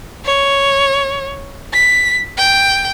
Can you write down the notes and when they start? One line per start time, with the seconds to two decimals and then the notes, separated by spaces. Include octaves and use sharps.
0.26 C#5
1.73 B6
2.38 G5